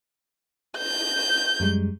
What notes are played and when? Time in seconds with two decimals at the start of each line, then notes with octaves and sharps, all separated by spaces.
0.77 G6
1.60 F#2 G3 G#3